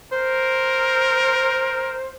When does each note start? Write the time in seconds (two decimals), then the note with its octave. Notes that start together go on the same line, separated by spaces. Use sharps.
0.12 A#4 C5